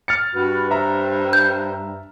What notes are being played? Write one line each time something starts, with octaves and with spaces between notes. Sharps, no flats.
F6 A6 C#7
G2 F#4 B4
C5 E5 A#5
G6